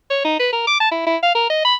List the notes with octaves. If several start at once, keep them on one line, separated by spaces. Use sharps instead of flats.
C#5
D#4
B4
A#4
D6
A5
E4
E4
F5
A#4
D#5
B5